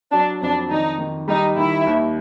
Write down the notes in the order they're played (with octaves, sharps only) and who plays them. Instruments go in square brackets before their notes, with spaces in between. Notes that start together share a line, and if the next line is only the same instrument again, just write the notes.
[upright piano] F#3 [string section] D4
[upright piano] F2 [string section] D4
[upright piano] D#3 [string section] D#4
[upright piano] D#3
[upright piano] G3 [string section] D#4
[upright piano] D#3 [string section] E4
[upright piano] D#2